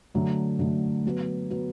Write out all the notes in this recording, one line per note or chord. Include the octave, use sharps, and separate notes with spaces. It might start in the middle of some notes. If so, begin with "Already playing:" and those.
D3 F#3 A3
D3 F#3 A3
F#3 B3 F#4 B4
F#3 B3 F#4 B4